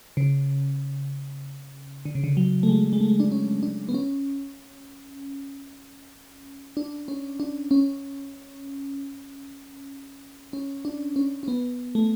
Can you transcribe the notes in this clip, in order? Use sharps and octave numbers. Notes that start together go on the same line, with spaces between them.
C#3
D3
C#3
D3
F#3
A3
G#3
G#3
A3
D4
C#4
D4
B3
C#4
D4
C#4
D4
C#4
C#4
D4
C#4
C#4
B3
A3